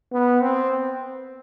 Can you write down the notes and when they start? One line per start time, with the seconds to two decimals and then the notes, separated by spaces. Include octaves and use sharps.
0.12 B3
0.42 C4